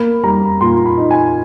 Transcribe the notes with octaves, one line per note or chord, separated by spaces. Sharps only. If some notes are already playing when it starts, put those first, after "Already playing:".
Already playing: A#3 B5
G3 A#5
A#2 C6
B5
D#4
G#5